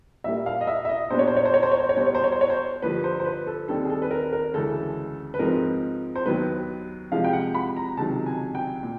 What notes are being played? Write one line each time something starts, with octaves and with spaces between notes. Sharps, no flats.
A#2 G3 A#3 E5
F5
D#5
E5
E5
D#5
A#2 G3 B3 D4 C5
C#5
C5
C#5
C5
C#5
C5
C#5
C5
C#5
B2 G3 B3 C5
C#5
C5
C#5
C5
C#5
C5
G2 D3 F3 A#3 B4
C5
C5
B4
A4
D#2 D#3 G3 C4 A4
G#4
A4
B4
A#4
A#4
D2 C#3 E3 G#3 C#4 A4
B4
G#2 F3 G#3 C4 A#4
C5
D#2 D#3 F#3 B3 B4
C3 F3 G#3 F5
G5
F#5
B5
A#5
C#2 C3 D#3 F#3 A5
G#5
G5
A#2